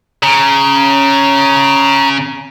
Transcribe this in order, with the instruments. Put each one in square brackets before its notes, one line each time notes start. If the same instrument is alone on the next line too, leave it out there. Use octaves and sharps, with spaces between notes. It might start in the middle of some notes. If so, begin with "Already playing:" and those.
[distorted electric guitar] C#3 [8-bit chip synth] A#5